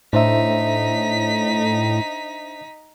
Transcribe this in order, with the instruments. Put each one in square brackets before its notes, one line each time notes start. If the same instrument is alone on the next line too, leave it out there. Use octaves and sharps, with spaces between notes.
[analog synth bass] A2 [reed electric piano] D4 C5 E5 [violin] D#4 B6